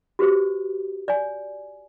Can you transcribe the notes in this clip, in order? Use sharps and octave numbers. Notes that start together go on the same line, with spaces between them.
F#4 G4 B4 C5
D5 G#5